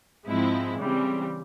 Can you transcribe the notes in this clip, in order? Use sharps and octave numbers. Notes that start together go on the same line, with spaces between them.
G#2 F3 G#3 C4 E4
C#3 E3 G3 C4